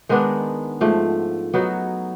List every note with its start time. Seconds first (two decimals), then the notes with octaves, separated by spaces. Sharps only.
0.09 D#3 G#3 B3 D4
0.81 G#2 F3 A3
1.54 F#3 B3 D#4 F#4